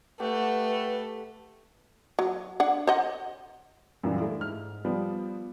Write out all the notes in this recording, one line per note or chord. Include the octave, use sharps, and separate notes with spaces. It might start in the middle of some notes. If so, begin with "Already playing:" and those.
A3 G4 B4 F#5
F#3
D4 F#5
C5 D#5 F#5
F#2 A#2 E3 G3
A3 D4 E4
G#2 F6
F3 G3 B3